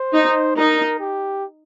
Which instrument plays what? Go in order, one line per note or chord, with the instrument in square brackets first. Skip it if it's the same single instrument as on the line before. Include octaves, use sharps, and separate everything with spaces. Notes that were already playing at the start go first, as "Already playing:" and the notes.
Already playing: [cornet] C5
[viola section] D#4
[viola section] D#4 [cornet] A#4
[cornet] G4